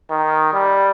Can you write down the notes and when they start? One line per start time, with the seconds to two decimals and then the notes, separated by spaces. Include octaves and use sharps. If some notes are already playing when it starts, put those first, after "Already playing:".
0.11 D#3
0.53 G3